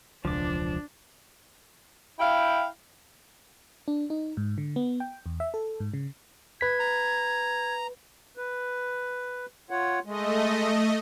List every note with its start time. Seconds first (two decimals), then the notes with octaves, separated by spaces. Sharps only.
0.25 E1 C#2 F3 D4 D6
2.19 E4 F5 G5
3.88 D4
4.10 D#4
4.37 G#2
4.58 D3
4.76 B3
5.00 G5
5.26 E2
5.40 E5
5.54 A4
5.80 G#2
5.94 C#3
6.61 B4 G#6 B6
6.80 A#5
8.37 B4
9.70 F4 C#5 F#5
10.05 G#3 A3 D#5